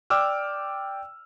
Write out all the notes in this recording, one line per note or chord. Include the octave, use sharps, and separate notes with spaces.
D5 G5 D6 E6 F6